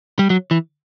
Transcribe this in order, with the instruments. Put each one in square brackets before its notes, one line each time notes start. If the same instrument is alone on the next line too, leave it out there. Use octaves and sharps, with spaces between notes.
[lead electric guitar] G3
F#3
E3